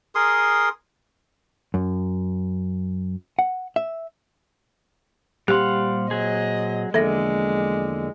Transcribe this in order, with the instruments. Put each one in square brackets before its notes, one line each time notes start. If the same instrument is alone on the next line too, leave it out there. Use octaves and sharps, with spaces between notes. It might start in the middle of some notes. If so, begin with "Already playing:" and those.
[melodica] G#4 A#4 C6 D#6
[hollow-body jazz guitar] F#2
F#5
E5
[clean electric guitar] A#2 C4 C6 [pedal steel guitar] G3 F5 F#5 [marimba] G4
[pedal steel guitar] F#3 G#4 [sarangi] D#5
[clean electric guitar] E2 F3 A#3 [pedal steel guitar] D3 [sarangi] G#3 [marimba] A4 E5 A#6